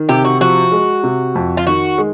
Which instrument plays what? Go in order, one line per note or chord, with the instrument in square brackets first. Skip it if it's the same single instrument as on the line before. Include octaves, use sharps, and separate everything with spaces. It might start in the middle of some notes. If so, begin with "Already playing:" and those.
Already playing: [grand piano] D#3
[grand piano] C3 [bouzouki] G4
[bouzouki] F#4
[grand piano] F3 [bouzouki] F#4
[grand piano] G#3
C3
F2
[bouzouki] F4
[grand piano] D#3 [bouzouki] F#4
[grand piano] G#3